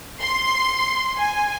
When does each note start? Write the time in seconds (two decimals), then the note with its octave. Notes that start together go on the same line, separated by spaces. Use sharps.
0.20 C6
1.18 G#5